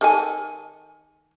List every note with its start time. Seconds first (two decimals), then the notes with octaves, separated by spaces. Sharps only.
0.01 D#3 A4 G#5